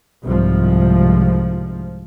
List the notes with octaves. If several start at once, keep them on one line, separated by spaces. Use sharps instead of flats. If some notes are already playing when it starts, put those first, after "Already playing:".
C2 G#2 F3